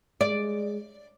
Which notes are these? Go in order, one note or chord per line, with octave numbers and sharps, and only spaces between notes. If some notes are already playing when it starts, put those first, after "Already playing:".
G#3 D5